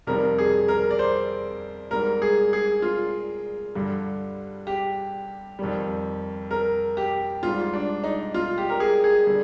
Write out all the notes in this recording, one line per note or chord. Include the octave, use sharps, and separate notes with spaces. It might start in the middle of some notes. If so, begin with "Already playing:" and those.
F2 C3 D#3 G3 A#4
G#4
A#4
D5
C5
G#2 G3 A#4
G#4
G#4
F4
G2 D3 G3
G4
F2 D#3 G3
A#4
G4
G#2 G3 F4
D4
D#4
F4
G4
A#4
G#4
G#4
D3 G3